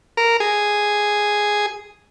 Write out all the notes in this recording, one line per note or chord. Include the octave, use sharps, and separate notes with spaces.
A#4
G#4